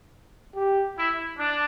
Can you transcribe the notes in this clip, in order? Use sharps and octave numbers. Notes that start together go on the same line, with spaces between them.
G4
E4
D4